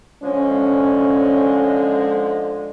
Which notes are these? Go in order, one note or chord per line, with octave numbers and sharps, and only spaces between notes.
D3 F3 G#3 C#4